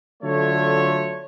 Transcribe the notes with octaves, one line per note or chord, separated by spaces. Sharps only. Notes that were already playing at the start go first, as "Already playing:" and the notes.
D3 F#3 A3 F4 C#5